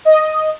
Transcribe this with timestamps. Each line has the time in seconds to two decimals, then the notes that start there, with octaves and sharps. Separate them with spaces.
0.05 D#5